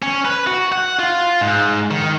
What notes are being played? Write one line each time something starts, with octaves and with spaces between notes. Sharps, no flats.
C#4
B4
F#4
F#5
F4
G#2
D#3